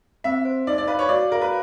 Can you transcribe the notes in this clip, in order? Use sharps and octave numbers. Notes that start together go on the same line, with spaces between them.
C4 E5
C5
D#4 D5
D5
B4 F5
C#5
F#4 D5
A#4 F5
B4